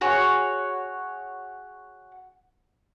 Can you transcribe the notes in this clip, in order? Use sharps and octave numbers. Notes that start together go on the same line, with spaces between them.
F#4 G#4 C#5